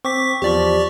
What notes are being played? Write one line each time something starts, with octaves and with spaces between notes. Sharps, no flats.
C4 C#6 D6 B6
E2 F3 G4 D5 C#6